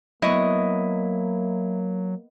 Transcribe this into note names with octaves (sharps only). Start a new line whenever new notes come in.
F#3 A#3 B3 E4 D#5 C#6